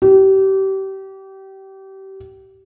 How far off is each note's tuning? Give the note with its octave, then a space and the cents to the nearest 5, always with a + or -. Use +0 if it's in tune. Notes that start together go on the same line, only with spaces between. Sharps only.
G4 -30